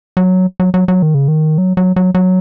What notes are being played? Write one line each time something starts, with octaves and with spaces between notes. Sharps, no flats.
F#3
F#3
F#3
F#3
D#3
C#3
D#3
F#3
F#3
F#3
F#3